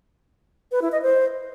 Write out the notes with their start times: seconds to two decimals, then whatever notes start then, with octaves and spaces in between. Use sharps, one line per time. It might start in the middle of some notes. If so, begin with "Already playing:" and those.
0.72 B4
0.82 E4
0.92 D#5
1.02 C5